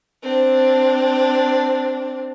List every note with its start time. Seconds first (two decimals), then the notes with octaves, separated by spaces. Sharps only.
0.23 C4 D4